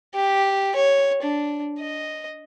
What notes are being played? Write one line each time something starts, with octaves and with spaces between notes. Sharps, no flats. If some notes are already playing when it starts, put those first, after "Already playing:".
G4
C#5
D4
D#5